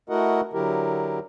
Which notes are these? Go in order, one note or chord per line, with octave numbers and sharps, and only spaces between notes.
A3 E4 F#4 A#4 D#5 F#5
D3 F#3 E4 G4 A#4